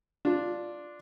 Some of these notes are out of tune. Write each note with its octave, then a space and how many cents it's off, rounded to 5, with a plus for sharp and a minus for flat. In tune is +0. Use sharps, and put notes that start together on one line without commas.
D4 +0 F4 +0